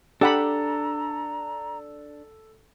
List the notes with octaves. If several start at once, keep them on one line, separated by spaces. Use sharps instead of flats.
D4 G4 A4 F#5 A#5 B5